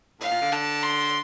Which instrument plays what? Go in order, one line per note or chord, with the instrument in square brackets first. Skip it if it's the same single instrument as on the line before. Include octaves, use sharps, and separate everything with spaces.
[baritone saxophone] A2 [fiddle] F5
[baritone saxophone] A#2
D3
[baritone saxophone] D3 [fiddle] A5
[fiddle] C6